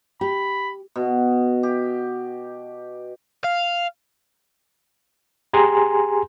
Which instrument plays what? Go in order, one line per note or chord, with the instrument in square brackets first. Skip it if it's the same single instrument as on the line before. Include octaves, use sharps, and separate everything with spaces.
[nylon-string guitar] G4 [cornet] B5
[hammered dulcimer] B2
G4
[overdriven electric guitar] F5
[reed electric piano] G4 G#4 G#5 A#5 C6